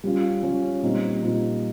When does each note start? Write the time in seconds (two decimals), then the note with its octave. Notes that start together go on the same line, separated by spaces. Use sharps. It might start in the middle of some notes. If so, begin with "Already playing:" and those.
0.04 G3 C#4 F4
0.43 G3 C#4 F4
0.82 A#2 G3 C4 D#4
1.21 A#2 G3 C4 D#4